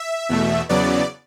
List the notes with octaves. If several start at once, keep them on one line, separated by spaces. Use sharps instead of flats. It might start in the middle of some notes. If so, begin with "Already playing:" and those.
Already playing: E5
E2 B2 A3
E2 C#3 F#3 B3 D5